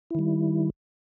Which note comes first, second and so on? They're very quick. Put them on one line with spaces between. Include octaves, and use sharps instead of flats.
E4 D#3 G3